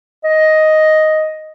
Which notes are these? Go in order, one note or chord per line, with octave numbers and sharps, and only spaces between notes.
D#5